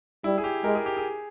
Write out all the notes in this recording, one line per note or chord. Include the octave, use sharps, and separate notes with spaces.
G3 E4
G#4
G4
G#3 A#4
G#4
G4
G#4